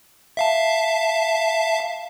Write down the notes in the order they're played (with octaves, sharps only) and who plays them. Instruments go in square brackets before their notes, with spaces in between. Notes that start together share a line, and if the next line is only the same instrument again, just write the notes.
[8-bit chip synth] E5 F5 A5